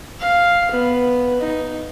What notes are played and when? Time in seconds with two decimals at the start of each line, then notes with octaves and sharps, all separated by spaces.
0.19 F5
0.71 B3
1.41 D#4